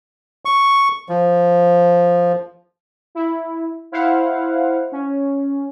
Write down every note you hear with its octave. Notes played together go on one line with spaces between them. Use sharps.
C#6
F3
E4
E4 C5 F5 F#5
C#4